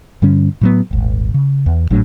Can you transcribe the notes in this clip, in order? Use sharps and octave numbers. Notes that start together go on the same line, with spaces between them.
G2 D3 G3 C#4
A2 F#3 B3
D#1 G#1
C#3
E2
G#1 A2 F#3 D4